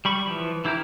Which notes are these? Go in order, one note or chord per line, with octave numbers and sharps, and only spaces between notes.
G3 B5 C#6
E3 F3
E3 E4 G4 A#4